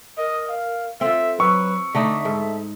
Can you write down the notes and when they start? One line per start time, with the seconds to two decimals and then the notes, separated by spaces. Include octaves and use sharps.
0.18 A#4 D#5
0.49 F5
1.01 C4 F4 A4 E5
1.40 F#3 B4 C#6 E6
1.95 D3 A3 D#4 D5 E5
2.25 G#2 A4